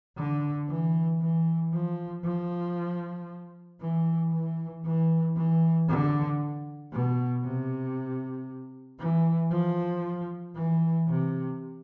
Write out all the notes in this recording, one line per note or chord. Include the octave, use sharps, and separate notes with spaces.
D3
E3
E3
F3
F3
E3
E3
E3
E3
D3
B2
C3
E3
F3
E3
C3